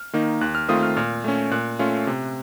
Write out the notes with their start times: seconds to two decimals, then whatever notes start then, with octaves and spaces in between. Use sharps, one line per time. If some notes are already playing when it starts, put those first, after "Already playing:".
Already playing: F6
0.13 D#3 A#3 D#4
0.41 D#2 F#6
0.55 F6
0.68 D#3 A3 C4 F4 D#6
0.83 F6
0.97 A#2 F6
1.24 A3 C#4
1.51 A#2 F#6
1.79 A3 C#4 F4
2.07 C3